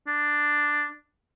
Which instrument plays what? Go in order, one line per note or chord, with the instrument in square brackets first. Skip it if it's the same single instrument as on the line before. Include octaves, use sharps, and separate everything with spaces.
[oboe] D4